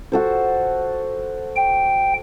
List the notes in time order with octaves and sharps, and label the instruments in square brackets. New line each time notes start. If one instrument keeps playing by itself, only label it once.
[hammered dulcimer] F#4 A4 C5
[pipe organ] G5